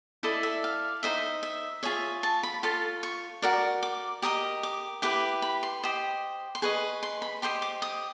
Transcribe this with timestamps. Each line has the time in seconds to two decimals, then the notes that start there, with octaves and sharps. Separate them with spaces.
0.23 E4 A4 D5 D#5
0.43 E5
0.64 F5
1.03 D#4 G#4 C5 D#5 E5
1.43 E5
1.83 F4 G#4 C#5 E5
2.23 A5
2.43 B5
2.63 F4 A4 C#5 C6
3.03 C#6
3.42 F#4 A#4 D5
3.83 D6
4.22 G4 A#4 D#5 D#6
4.63 D6
5.02 E4 G4 B4 D6
5.42 B5
5.63 C6
5.83 G4 C5 D#5
6.55 C6
6.62 G#4 B4 D#5 C#6
7.03 C6
7.22 B5
7.42 G4 C5 D#5 C6
7.62 D6
7.82 D#6